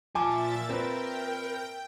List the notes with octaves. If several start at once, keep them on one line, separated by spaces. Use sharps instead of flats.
A#2 F3 E5 G#5 A5 D6 A6
C4 A#4 B4 G5